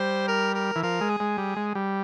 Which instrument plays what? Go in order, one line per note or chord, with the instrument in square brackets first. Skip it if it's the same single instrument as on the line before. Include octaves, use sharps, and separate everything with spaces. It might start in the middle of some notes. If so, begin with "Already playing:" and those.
Already playing: [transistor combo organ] G3 [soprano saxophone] C5
[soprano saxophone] A#4
A#4
[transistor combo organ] E3
[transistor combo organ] F3 [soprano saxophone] A#4
[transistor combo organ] G#3
[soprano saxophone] G#4
[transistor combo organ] G#3
G3
G#3
G3